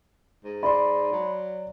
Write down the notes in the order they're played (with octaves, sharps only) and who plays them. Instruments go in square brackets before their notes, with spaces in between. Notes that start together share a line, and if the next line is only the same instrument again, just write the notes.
[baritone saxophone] G#2
[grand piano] D5 [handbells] B5 C6
[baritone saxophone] F#3